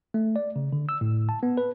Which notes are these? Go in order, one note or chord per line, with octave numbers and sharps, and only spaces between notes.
A3
D5
C#3
D3
E6
A2
A5
B3
B4